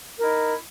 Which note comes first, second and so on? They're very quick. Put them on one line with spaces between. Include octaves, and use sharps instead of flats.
A#4 E4 D#4